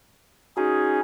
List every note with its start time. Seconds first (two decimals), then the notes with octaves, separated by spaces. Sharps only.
0.57 C#4 D#4 F#4 G#4 G#5